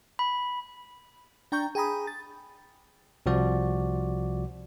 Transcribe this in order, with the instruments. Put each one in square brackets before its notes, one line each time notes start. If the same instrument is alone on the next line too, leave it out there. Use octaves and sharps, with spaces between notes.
[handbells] B5
[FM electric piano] D4 G5 A#5 C#6 G6
G#4 G5 G#5 A#5 B5 D#6
A6
[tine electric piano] C2 C3 F3 F#4 D5